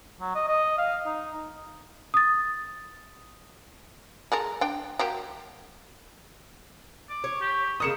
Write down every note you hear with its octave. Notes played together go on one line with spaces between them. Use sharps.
F#3
D#5
D#5
F5
D#4
D#6 A6
G#3 A4 A#4
D4 G5
F#3 A#3 G4
D6
C#5
G4
C#3 A#3 D#5 D#6 C#7 E7